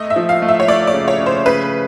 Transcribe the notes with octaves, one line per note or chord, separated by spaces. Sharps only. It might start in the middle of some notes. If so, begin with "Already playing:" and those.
Already playing: A3 D#5
E5
F3
F5
A3
E5
C#5
A3 D5
D5
C#3
C#5
C#3
C5
C#3 B4